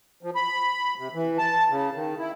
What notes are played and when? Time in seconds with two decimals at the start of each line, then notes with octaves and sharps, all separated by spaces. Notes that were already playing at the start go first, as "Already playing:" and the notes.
0.23 F3
0.35 B5
0.98 C3
1.14 E3
1.38 A5
1.70 C#3
1.94 D#3
2.19 E4